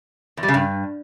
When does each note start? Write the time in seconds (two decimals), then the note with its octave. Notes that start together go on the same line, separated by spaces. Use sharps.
0.37 E2
0.43 G3
0.48 C#3
0.54 G2